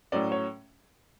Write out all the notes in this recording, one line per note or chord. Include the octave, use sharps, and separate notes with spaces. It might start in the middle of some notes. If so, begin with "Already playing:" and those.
A2 F#3 C#4 D5
C#5